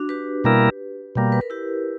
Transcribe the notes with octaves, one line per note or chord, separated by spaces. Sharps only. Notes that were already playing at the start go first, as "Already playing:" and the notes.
Already playing: D4 F#4
G4 B4
B2 G3 A#3 E4 A#4
B2 G3 A#3
B4
A#4
E4 G4